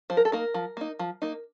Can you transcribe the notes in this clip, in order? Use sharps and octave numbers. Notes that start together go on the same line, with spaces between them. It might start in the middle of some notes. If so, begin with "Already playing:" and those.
F3 C5
A#4
A4
A#3 D#4 A#4
F3
A#3 D#4
F3
A#3 D#4